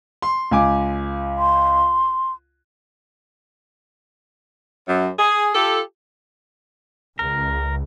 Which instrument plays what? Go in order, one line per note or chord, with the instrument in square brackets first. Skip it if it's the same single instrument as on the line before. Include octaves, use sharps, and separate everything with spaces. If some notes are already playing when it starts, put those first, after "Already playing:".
[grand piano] C6
C#2 G#5 D6
[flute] C6
[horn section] F#2
G#4
F4 G4 A4
[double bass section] C#2 [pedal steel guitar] A#4